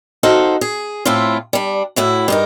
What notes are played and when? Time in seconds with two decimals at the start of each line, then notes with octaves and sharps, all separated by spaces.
0.23 D#4 F#4 A4 C5 F5
0.61 G#4
1.05 A2 A3 C4 E4 F4
1.53 G3 D4
1.96 A2 E4 F#4
2.28 G2 D#4 A#4